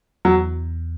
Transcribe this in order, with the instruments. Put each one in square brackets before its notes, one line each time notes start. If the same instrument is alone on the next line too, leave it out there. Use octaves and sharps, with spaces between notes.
[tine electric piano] E2 [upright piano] F#3